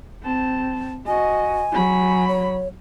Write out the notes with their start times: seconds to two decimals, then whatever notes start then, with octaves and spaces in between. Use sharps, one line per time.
0.23 C4 A5
1.07 F#4 D#5 G#5
1.72 F#3 B5
2.28 C#5